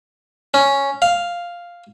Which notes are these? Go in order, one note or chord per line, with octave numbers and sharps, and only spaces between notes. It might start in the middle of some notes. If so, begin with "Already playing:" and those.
C#4
F5